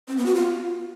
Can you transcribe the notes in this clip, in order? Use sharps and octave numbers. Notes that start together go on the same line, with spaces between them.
C4
B3
F#4
F4